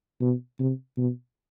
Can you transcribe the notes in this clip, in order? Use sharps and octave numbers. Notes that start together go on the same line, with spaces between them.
B2
C3
B2